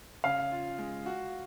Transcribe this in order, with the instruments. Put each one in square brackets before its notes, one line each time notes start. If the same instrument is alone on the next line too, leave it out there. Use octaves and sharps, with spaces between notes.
[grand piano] C#3 [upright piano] F5
[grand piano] F4
G#3
F#4